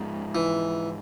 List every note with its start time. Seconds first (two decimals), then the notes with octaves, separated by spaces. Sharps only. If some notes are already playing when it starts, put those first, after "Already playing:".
Already playing: G#2 F3 G#3
0.35 E3